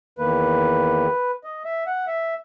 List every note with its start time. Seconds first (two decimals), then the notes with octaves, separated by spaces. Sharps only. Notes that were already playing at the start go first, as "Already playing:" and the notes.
0.18 E2 D#3 A#3 B4
1.44 D#5
1.65 E5
1.86 F#5
2.07 E5